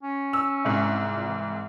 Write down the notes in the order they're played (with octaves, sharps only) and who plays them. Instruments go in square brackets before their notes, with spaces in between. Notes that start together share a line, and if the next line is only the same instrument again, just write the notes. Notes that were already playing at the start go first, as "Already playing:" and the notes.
[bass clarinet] C#4
[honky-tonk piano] E6
C2 G#2
[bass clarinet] A#2
E3